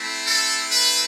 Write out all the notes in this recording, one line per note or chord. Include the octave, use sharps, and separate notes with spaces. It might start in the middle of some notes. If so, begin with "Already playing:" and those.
Already playing: A3 C4 E4
A4
B4